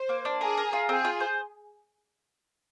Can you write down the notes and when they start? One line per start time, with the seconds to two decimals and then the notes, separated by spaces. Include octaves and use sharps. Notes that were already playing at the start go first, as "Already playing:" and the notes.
Already playing: C5
0.09 A#3
0.25 D4
0.41 G#4 A#4
0.57 A#4
0.73 F4
0.89 C4 G#4
1.05 F4
1.20 C5